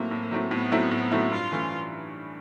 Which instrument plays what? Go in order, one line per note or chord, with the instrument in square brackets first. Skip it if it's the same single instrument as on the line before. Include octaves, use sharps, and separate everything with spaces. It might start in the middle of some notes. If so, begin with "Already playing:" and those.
Already playing: [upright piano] A2 F#3 A3 C4 E4 [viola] A#3
[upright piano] A2
F#3 A3 C4 E4
[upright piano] A2 [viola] B3
[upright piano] F#3 A3 C4 E4
A2
F#3 A3 C4 E4
[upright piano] G2 [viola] F4
[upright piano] E3 A3 C#4